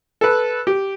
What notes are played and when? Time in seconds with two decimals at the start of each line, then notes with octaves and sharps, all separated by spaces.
0.21 A4 B4
0.67 G4